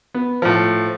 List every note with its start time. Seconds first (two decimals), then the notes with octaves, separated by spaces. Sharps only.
0.14 B3
0.42 A2 F3